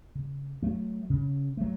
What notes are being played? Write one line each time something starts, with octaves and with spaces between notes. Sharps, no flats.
C#3
F#3 A3
C#3
F#3 A3